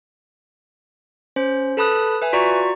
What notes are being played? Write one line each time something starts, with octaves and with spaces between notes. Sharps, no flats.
C#4 C5
A4 B4 A5 B5 D#6 F#6
B4 E5 G#5
F4 F#4 D5 A#5 C#6